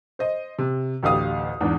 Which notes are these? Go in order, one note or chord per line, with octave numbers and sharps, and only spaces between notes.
C5 D#5
C3
A1 D2 G4 F5 D#6
E2 G#2 D4